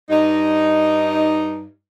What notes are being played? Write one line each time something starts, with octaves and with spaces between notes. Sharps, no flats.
G2 D#4